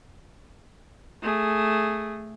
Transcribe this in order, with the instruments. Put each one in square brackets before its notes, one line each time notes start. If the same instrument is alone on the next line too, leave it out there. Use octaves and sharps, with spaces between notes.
[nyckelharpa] A3 G#4